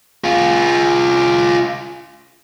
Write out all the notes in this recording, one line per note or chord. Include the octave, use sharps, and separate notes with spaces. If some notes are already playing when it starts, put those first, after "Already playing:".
F4 G#4